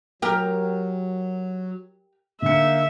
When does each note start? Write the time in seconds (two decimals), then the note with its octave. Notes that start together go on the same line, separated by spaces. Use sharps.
0.22 F#3 G4 A#4
2.42 D3 A#3 D#4 E5 C#7